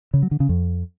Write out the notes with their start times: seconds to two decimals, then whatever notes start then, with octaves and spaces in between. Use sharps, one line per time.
0.14 C#3
0.22 F#3
0.31 D3
0.40 C#3
0.49 F2